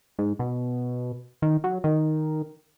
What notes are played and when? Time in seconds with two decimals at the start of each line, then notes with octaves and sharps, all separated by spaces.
0.19 G#2
0.39 B2
1.42 D#3
1.64 F#3
1.84 D#3